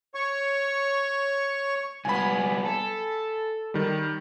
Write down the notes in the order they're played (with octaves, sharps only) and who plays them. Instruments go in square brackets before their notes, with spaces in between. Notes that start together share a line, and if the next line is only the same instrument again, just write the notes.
[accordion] C#5 C#6
[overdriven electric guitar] C2 B3 [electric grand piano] G#5 B5
[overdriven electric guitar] A4
[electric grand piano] D#3 G3